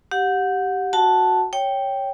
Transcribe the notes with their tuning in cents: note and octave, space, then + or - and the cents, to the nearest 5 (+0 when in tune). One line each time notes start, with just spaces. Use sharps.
G4 -10 F#5 -25
F#4 +0 F#5 +25 A5 +0
C#5 +0 G5 +0